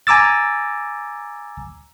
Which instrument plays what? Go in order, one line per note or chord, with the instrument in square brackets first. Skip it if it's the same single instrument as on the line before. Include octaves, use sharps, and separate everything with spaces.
[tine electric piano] G#5 A#5 D6 E6 A6